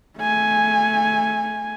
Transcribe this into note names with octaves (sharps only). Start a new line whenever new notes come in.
A3 G#5